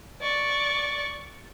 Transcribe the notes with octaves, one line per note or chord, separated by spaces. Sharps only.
D5 C#6